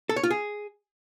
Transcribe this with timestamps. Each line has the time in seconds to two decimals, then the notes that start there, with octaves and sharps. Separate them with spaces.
0.09 A4
0.16 C#5
0.23 F4
0.30 G#4